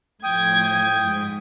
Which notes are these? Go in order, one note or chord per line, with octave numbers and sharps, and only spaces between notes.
A2 F3 G5 D#6 G#6
G#2